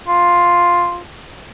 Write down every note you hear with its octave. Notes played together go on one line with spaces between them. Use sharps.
F4